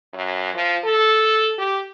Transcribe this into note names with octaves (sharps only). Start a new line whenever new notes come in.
F#2
F3
A4
G4